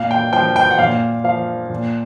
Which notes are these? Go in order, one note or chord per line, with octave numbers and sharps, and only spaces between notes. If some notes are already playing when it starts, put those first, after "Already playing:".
Already playing: A#2 F5
G5
F3 G5
G5
F#5
A#2 F5
F3 F5
A#2